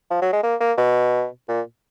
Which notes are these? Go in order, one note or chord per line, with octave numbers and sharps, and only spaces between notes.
F3
F#3
G#3
A#3
A#3
B2
A#2